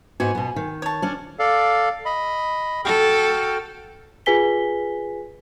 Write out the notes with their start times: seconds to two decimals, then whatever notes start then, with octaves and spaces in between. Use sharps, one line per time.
0.20 G#2 B3 F#4 G#5
0.35 B2 B3
0.56 D#3
0.82 C#5 A5
1.02 C#4 D4
1.39 A4 D5 F5
2.05 D#5 B5
2.85 F#4 A4 G5 F6
4.26 F4 G#4 B4 G#5 B6 G7